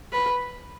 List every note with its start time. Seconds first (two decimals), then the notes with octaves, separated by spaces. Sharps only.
0.13 B4